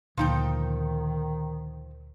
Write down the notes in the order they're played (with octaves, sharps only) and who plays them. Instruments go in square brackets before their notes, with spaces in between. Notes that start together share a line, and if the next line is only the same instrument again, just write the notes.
[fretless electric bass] D2 A#2 [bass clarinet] D#3 [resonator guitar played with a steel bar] F3 D#4 G5